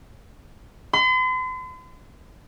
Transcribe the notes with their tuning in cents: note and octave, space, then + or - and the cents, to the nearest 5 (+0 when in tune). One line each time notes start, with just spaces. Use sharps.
C6 -45